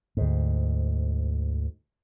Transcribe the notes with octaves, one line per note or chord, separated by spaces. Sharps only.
D2 G#2